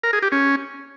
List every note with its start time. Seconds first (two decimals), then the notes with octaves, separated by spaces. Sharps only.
0.03 A#4
0.13 G#4
0.22 G4
0.32 C#4